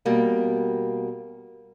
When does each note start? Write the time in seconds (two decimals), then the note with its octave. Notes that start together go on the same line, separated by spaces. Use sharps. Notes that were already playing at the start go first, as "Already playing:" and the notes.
0.06 B2 G3 A#3